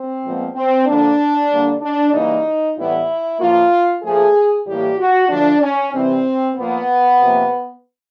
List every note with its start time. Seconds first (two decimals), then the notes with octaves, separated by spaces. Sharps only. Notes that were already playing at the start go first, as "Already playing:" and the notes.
Already playing: C4
0.23 A#2 F3 G#3 B3
0.54 C4
0.86 D3 F3 A#3 D4
1.49 D3 G3 A#3
1.81 D4
2.12 C#3 E3 G3 A#3 D#4
2.76 A2 E3 G3 B3 E4
3.39 A2 F3 A#3 F4
4.02 A#2 F3 A3 G#4
4.65 A2 E3 G3 A#3 G4
4.98 F#4
5.29 D3 F3 A3 D4
5.61 C#4
5.93 C3 E3 G3 C4
6.56 A#2 F3 A#3 B3
7.19 C3 F3 A#3